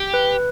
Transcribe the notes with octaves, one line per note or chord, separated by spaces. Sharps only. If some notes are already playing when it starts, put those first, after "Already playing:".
Already playing: G4
B4